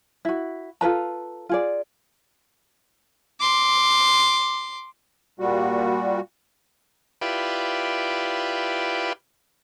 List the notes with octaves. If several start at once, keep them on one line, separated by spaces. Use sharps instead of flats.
E4 F#4
F4 A4 B4 A#5
F4 G#4 D5
C6 D6
A#2 G3 F#4
E4 F4 G4 B4 D5